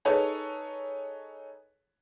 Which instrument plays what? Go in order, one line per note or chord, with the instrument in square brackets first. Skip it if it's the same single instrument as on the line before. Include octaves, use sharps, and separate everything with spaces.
[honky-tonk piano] D#4 G#4 A4 B4 C#5